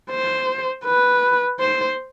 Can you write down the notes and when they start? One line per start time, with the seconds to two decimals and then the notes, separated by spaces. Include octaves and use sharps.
0.10 C5
0.85 B4
1.60 C5